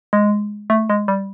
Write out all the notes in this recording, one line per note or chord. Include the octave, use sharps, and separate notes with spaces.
G#3
A3
G#3
G3